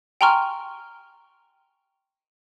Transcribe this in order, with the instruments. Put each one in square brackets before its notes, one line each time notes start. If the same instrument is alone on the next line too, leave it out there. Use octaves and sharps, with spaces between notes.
[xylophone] G5 G#5 A#5 C6 C#6 F6